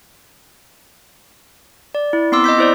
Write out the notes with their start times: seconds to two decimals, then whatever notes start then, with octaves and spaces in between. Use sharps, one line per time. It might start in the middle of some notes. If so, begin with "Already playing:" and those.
1.95 D5
2.13 E4
2.32 B3 C4 C6 D6 E6
2.44 D#5 E6 G6 B6
2.58 E4 C5 D5